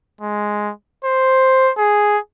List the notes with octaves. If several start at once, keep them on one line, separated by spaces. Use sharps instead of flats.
G#3
C5
G#4